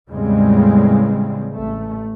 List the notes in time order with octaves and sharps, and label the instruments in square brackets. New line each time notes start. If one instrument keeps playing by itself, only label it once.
[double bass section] E2 A2 C#3 G3 G#3 C4
A1 A3